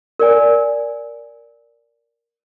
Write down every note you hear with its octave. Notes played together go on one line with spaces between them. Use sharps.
A#4 D5 G#5